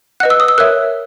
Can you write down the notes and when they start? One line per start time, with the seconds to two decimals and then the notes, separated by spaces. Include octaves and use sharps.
0.20 B4 D#5 F#5 F#6
0.30 E6
0.40 D#6
0.48 E6
0.58 A#4 C#5 E5 F#6